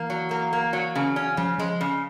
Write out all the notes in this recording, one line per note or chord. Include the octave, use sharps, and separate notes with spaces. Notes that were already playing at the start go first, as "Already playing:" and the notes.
Already playing: E3 A#3
F#3
A#3
A#3
F#3
C#3
C#4
C#3 F3
F3 G#3
C#3